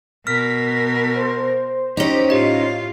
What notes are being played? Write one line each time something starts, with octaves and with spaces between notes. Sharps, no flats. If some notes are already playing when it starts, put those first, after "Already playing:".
B2 A#4 F6 B6
C5
C#4 D#4 G4
A2 F4 G4 D#5